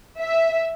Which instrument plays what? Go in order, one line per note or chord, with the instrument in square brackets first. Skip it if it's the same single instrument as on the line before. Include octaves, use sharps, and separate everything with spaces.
[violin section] E5